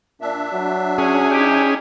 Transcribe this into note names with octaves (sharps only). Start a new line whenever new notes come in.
A#2 D4 E5
F#3
C#4 G#4
D#4 E4 G4